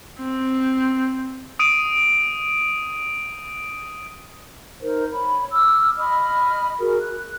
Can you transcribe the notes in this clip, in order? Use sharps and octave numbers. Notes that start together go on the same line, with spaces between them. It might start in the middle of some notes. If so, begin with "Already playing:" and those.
C4
D#6 D7 D#7
D#4 A#4 C5
C#5 B5
D6 E6 F6
D#5 B5 D#6 F6
F#4 G#4 A#4
F#6